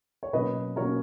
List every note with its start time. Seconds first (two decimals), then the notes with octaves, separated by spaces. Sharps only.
0.23 C#5
0.33 B2 F#3 A#3 C#4 B4 D#5
0.76 B2 F#3 A#3 C#4 A#4 C#5